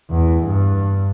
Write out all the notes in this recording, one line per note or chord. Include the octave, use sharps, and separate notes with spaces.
E2
G2